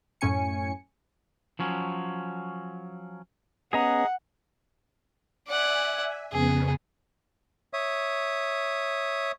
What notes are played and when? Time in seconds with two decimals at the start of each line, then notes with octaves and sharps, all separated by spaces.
0.21 F#2 A2 C#4 G#5 C#7
1.59 F3 F#3 C#4
3.73 B3 C#4 G#4 B4 D#5 F#5 A#5
5.48 D5 E5 F#5 G#5
6.32 F2 C#3 B3 G#4
7.73 C#5 E5 D#6